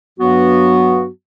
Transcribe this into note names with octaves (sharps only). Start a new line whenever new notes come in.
G2 F#3 B3 F#4